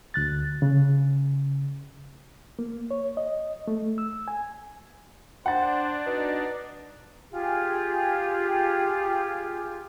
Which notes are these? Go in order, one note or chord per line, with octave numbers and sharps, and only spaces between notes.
D2 F#6 A6
C#3
A#3
C#5
D#5
A3
E6
G#5
D4 C5 F#5 A6
B2 D#4
F4 G4 G#4